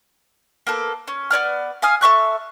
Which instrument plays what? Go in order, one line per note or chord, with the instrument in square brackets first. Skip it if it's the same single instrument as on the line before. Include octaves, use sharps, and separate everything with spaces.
[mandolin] A#3 B3 A4
C#4
B3 C#5 D5 F6
F5 G#5 D#6 F6
A4 E5 C#6 F#6